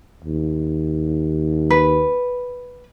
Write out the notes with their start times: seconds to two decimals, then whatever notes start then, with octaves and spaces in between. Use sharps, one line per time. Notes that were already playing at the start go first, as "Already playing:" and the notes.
0.24 D#2
1.70 B4